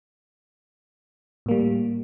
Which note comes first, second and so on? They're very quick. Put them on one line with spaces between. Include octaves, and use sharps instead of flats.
A2 A#3 G3